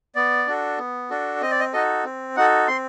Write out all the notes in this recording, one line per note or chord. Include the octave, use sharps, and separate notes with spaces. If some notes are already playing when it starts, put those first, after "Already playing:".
B3 D5
D4 F#4 A4
B3
D4 F#4 A4
C4 D#5
D5
D#5
D#4 F#4 A4 D#5
C4
D#4 F#4 A4 F#5
C4 C6